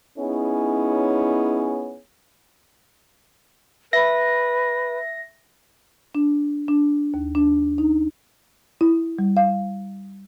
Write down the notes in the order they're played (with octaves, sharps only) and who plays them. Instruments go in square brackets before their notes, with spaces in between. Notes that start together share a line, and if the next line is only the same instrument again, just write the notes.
[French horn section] B3 C#4 D#4 E4 G#4 C#5
[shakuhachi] B4 [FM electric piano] E5 A#6
[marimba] D4
D4
D#2
D4
D#4
E4
G3
F5